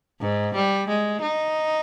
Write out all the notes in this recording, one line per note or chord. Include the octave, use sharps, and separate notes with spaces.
G#2
G3
G#3
D#4